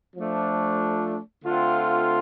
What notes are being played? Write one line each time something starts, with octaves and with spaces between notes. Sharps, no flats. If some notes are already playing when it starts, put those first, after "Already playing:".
F3 A3 D4
D3 A3 C4 F4